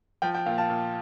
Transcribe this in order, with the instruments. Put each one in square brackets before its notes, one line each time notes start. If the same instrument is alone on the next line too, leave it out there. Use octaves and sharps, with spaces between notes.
[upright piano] F3 [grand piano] G5
[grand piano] G5
[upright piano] A#2 [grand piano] F5
[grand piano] F5 A5
[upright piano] A#2